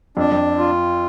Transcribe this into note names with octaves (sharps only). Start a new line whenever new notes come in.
F2 D4
F2
F4